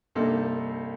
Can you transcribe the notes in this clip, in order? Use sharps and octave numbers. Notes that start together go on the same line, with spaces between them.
C2 G2 C3 A#3 D#4 A4